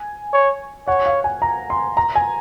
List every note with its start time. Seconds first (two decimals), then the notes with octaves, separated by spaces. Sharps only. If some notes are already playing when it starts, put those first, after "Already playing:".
Already playing: G#5
0.33 C#5
0.88 C#5 F#5
1.06 F5
1.24 G#5
1.42 A#5
1.70 C6
1.97 A#5
2.15 G#5